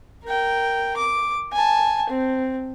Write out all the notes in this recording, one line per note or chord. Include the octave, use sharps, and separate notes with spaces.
A#4 G5
D6
G#5 A5
C4